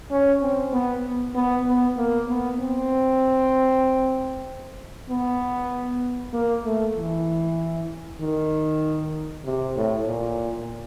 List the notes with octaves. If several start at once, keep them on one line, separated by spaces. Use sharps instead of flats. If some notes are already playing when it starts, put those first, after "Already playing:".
C#4
C4
B3
B3
B3
A#3
B3
C4
B3
A#3
A3
E3
D#3
C3
A2
A#2